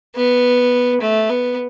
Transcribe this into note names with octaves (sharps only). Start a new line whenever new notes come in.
B3
A3
B3